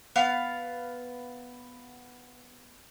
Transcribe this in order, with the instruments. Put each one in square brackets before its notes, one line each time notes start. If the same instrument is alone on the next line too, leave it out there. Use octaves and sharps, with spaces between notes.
[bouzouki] B3 F5